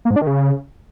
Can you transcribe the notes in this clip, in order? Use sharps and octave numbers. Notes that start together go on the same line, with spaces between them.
A#3
G#2
D4
D#3
C#3